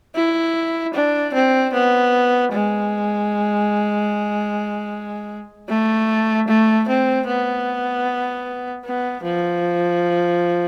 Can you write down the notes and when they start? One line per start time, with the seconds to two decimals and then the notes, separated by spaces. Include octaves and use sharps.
0.15 E4
0.94 D4
1.34 C4
1.73 B3
2.52 G#3
5.69 A3
6.48 A3
6.88 C4
7.27 B3
8.85 B3
9.24 F3